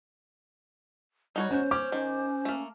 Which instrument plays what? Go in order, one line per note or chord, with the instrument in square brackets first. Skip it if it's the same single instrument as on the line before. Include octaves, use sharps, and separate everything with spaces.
[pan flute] G3 [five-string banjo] D#4 F#4 C#5
[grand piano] C#4 [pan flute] C5
[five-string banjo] C#4 [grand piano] D6
[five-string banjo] D#3 [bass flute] C#4
[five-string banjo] A3 A#3